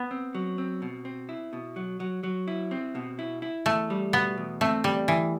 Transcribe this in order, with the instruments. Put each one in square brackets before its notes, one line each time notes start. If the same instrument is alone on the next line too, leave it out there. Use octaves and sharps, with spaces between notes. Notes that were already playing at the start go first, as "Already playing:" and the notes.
Already playing: [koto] B3
[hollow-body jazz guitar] C4
F#3
C4
B2
C4
E4
B2
F#3
F#3
F#3
E4
C4
B2
E4
E4
[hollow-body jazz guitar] E2 [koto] A3
[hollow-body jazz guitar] G3
[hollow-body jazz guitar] B2 [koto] B3
[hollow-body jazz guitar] E2
[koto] A3 [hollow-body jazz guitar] C4
[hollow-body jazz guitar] E2 [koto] G3
[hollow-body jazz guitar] E2 [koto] E3